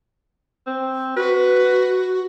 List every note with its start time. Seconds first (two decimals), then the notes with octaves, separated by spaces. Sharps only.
0.66 C4
1.16 F#4 B4